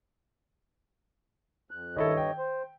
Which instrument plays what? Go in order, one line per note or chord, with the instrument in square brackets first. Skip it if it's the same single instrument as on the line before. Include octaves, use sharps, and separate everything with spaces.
[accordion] F2 F#6
[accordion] G2 C#5 D#5 [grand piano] D#3 E4 A4
[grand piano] G5
[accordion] C5